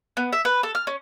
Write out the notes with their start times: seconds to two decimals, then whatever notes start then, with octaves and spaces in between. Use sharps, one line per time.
0.17 B3
0.33 E5
0.45 B4
0.63 A4
0.75 F6
0.87 C#4